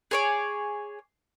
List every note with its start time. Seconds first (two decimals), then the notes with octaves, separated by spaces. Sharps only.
0.11 G#4 C#5 D6